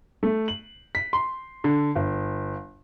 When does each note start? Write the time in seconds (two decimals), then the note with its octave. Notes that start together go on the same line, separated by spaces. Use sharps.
0.23 A3
0.48 F#7
0.95 B6
1.13 C6
1.64 D3
1.96 G1